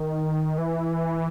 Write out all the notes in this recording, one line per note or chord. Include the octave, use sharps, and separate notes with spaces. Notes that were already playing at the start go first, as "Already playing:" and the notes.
Already playing: D#3
E3